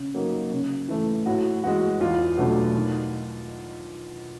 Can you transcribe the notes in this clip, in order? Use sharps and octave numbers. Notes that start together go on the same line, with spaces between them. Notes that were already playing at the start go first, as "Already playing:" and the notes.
Already playing: C#3
F#3 A#3 D#4
C#3
E3 A3
A2 F#4
E3 G#3 F#4
E2 F4
B2 F#3 A3 D4
D#3